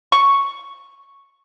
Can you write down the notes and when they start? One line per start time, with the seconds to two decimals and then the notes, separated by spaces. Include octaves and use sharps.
0.12 C#6